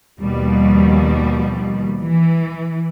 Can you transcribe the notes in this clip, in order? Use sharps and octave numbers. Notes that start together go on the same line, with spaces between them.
D#2 B2 F3 G3
E3